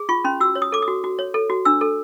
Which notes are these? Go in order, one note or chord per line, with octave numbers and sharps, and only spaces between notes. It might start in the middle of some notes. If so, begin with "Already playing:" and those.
Already playing: G#4
F4 C#6
C#4 C6
F#4 E6
C#5
D#6
A4 D6
D#6
F#4
F#4
C#5
A4
F#4
D4 E6
A4